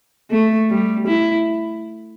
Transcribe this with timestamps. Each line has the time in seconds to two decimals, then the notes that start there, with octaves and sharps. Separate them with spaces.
0.31 A3
0.70 G3
1.07 E4